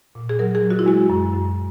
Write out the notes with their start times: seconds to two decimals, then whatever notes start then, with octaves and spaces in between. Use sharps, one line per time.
0.15 A#2
0.29 G#4
0.39 F#3 A#4
0.55 G#4
0.63 F#3
0.70 F#4
0.79 E4
0.86 G#3 F#4
1.10 F#2
1.33 F#2